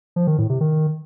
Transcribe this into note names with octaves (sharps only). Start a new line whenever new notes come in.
F3
D#3
A2
C3
D#3